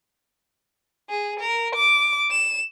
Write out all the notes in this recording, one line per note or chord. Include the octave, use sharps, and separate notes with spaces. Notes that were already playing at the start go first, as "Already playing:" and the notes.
G#4
A#4
D6
E7